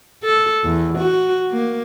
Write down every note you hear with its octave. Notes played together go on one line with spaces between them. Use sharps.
A4
E2
F#4
A#3